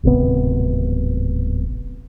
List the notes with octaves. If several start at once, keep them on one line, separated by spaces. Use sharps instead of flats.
D1 G#1 C3 B3